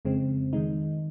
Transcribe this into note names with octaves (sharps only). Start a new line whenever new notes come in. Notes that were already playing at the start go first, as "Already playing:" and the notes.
F2 C#3 G#3 C4
D#3 G#3 D#4